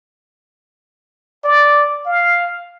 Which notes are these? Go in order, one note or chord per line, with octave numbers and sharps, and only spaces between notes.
D5
F5